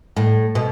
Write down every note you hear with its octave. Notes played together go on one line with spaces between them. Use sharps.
A2
B2